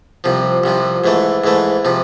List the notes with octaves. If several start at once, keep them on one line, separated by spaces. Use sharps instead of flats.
C2 C3 F3
C2 C3 F3
G#2 E3 A3
G#2 E3 A3
C3 F3